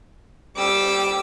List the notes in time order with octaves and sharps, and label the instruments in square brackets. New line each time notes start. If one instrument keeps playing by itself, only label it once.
[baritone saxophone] G3 [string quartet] D6 E6